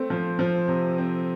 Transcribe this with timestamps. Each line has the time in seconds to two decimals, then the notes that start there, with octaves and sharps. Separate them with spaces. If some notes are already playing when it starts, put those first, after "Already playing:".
Already playing: A3 C4
0.10 F3
0.39 F3
0.68 C3
0.98 C4